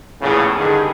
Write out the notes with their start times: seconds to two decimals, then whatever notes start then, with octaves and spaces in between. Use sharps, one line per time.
0.21 A#1 E2 A2 C#3
0.57 G2 D3 D#3 G3 G#4